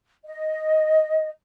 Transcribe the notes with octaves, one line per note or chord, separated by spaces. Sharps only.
D#5